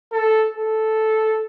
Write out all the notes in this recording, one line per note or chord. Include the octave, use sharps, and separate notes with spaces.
A4
A4